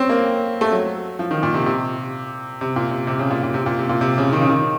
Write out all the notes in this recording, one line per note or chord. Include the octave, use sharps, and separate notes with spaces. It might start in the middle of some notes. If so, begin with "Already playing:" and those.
Already playing: C4 C#4
A#3
A3
F#3
F3
D#3
A#2
C3
C3
C3
A#2
C3
C3
C#3
A#2
A#2
C3
A#2
C3
A#2
C3
C#3
D#3
C#3
D#3